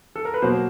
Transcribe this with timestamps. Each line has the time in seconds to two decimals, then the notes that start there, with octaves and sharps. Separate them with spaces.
0.16 A4
0.25 A#4
0.34 B4
0.42 B2 F#3 A#3 C5